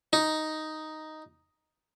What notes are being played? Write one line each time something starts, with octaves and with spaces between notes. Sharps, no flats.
D#4